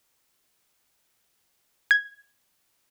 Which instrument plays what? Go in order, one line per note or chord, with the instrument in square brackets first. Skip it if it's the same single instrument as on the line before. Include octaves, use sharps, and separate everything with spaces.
[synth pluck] G#6